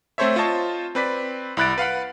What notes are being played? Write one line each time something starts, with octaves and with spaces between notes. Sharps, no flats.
A3 C4 A4 C5 C#5 E5
F4 C5 C#5 D#5 A5 C#6
C4 B4 D5 B6
C2 E4 B5 F#6 A6 D7
B4 F5 F#5 B5